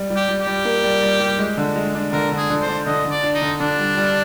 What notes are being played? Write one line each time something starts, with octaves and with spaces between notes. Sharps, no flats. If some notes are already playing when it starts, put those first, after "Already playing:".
Already playing: G3
G3
G4
G3
G4
G3
A#3
G3
G3
G3
G#3
D3
G#3
D4
D3 A#4
D3
G#4
D3
C5
D4
D3 D#5
D3
D5
D4
D#4
D3
D3 D4
G3
G3